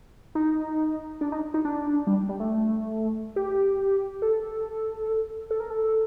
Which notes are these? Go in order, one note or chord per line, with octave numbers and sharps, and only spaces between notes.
D#4
D4
D#4
D#4
D4
G3
G3
A3
G4
A4
A4
A#4
A4